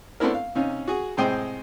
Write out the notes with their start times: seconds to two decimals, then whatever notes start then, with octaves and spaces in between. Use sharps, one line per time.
0.20 A3 B3 C4 D4 E4 A#4
0.35 F5
0.55 C3 C#4 D#4 F5
0.88 F#4 G#4
1.17 A2 C3 G#3 C5 G5 D#6